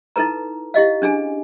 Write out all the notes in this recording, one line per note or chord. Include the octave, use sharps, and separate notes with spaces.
D#4 E4 A4 B4 A#5
E4 G4 D#5 F5
C#4 D4 G#4 G#5